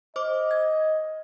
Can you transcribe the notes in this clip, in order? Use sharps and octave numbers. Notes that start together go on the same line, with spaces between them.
C5 D#5 D6
G#6